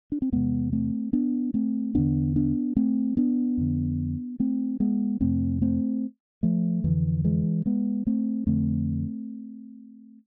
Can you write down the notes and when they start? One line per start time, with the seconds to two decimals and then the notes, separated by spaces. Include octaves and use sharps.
0.12 D4
0.22 C4
0.32 E2 C3 G#3 B3
0.73 A3 C4
1.13 B3 D4
1.54 A3 C4
1.95 E2 D3 B3 D4
2.36 B3 D4
2.77 A3 C4
3.17 B3 D4
3.58 F2 D3
4.40 A3 C4
4.80 G#3 B3
5.21 F2 C3 A3 C4
5.61 A3 C4
6.43 F3 A3
6.84 F2 D3 E3
7.24 E3 G#3
7.66 G#3 B3
8.07 A3 C4
8.47 F2 D3 A3 C4